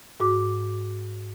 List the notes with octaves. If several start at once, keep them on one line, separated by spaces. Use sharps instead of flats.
G#2 F#4 D6